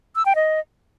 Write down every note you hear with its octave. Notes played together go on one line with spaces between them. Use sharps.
E6
G5
D#5